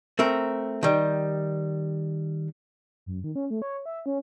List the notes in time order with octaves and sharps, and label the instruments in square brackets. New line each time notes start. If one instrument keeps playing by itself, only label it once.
[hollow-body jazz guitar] A3 C4 A#4
D#3 G3
[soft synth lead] F#2
D#3
C#4
A3
C#5
E5
C#4